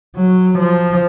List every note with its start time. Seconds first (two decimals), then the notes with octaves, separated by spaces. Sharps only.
0.16 F#3
0.59 F3